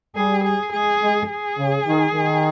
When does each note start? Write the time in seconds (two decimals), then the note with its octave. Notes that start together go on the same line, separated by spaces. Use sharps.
0.16 G3 G#4
0.44 G#4
0.73 G#3 G#4
1.02 G#3
1.30 G#4
1.58 C#3
1.87 D#3
2.14 D#3